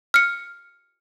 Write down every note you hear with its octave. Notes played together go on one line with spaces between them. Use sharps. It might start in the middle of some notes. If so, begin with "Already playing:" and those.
F6 C#7